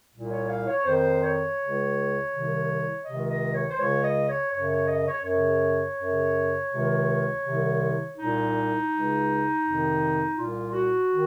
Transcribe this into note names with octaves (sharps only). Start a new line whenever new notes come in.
C2 A#2
C#5
F5
C#5
F2 D#3 C5
C#5
C#3
C#2
C2 C3 D#3
C#2 C3 D#3 D#5
D#5
C#5
C5
C#2 C#3 C#5
D#5
C#5
F#2 C#3 C#5
C#5
D#5
C#5
F#2 C#3 C#5
F#2 C#3
C#2 C3 D#3
C2 C3 D#3
C2 A#2 D#4
C#2 C#3
F2 C3 D#3
C2 A#2 F4
F#4
D#3